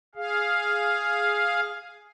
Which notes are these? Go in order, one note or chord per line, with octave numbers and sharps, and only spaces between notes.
G#4 F5